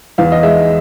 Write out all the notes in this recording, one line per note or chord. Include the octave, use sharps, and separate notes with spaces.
E2 F5
D#5
G#3 E5